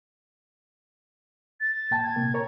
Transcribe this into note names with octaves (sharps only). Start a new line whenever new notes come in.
A6
A#2 G5 A5
G#6
C3 A#3
A#4 C#5 A#5